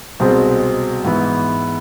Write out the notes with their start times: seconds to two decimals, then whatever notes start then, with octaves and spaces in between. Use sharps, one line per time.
0.20 C2 B2 G#3 C4 C5
1.04 G#2 E3 B3